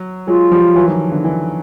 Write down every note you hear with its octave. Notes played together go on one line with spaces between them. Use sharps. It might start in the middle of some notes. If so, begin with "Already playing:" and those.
Already playing: F#3
F#3 G#3 F4
F3 G3
E3 F#3
D#3 F3
D3 E3
D3 E3